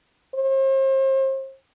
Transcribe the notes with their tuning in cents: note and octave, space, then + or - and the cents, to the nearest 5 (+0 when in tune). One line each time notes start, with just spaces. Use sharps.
C5 +40